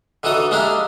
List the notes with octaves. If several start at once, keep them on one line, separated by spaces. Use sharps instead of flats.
D3 E3 D#4 F#4 A4 D#6
G#3 A#3 D4 E4 G4 A#4